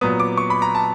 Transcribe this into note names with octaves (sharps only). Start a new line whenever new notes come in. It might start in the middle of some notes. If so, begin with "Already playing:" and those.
A#2 F#3 B3 D#6
D6
C#6
B5
A#5
A5